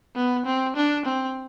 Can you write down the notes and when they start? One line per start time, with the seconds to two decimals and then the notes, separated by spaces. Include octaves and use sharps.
0.16 B3
0.46 C4
0.76 D4
1.06 C4